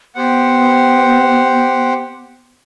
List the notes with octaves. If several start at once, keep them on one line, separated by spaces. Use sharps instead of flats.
B3 G4 C5 F#5